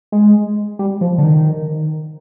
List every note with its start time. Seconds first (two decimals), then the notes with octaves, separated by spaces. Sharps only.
0.12 G#3
0.79 G3
1.01 F3
1.18 D3
1.24 D#3